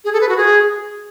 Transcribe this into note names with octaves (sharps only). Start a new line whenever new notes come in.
G#4
A4
B4
F#4
G#4